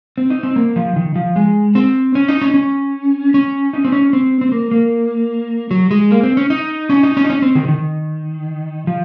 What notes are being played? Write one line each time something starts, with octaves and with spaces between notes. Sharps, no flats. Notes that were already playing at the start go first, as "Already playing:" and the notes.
C4
D#4
C4
A#3
F3
D#3
F3
G#3
C4
C#4
D#4
C#4
C#4
C#4
D#4
C4
C#4
C4
C4
A#3
A#3
F#3
G#3
A#3
C4
C#4
D#4
C#4
D#4
C#4
D#4
C#4
C4
D#3
D#3
F3